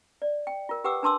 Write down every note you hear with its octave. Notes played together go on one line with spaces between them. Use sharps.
D5
G5
F4 A#4
G4 B4 F#5 G5 D6 E6
D4 B4 A5 C6 D6 E6